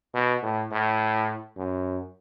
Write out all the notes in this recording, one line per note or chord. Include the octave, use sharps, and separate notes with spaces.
B2
A2
A2
F#2